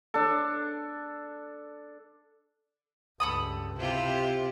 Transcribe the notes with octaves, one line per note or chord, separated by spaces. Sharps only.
D4 A4
C#2 G2 A4 B5 D#6
C3 E4 F4 G4